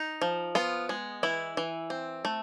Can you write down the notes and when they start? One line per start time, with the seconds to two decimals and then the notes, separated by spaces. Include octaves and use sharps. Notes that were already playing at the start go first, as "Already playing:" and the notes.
Already playing: D#4
0.22 F3
0.55 B3 F4
0.89 G#3
1.23 E3 E4
1.57 E3
1.90 C4
2.25 A3